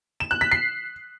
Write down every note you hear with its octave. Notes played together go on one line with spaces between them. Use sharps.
E7
F#6
B6
C7